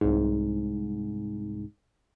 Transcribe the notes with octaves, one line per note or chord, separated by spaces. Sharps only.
C2 G#2